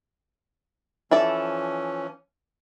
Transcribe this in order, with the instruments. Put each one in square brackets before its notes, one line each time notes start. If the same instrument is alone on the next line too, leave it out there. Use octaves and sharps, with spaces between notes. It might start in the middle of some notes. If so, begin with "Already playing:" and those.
[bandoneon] E3 F3 C#4 [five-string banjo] E4 A4 D5